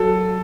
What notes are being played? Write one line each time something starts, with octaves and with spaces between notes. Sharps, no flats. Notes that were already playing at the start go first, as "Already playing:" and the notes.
Already playing: F#3 A4